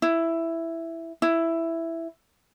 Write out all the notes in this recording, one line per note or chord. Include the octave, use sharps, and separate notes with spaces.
E4
E4